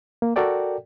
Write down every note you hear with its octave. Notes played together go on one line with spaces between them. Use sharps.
A#3
F#4 A4 A#4 D5 G5